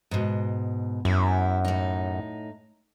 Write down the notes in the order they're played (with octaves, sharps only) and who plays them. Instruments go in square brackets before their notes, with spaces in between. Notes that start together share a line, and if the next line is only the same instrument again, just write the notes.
[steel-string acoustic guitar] G#2 B2
[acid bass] F#2 [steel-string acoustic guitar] E4
[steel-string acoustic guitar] A2 D#4